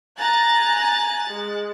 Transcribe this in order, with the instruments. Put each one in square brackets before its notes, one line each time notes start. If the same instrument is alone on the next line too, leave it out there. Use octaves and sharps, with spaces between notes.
[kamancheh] G#5 A#5 [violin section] F#6 A6
[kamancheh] G#3